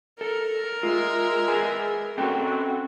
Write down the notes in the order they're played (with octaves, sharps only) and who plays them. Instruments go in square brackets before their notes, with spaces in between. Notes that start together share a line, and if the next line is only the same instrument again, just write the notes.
[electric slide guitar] A4 [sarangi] A#4
[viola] G#3 E5 [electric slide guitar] F4
[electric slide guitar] G#4 B4 G#5
[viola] C4 F#4 [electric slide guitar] C#4 A4 G5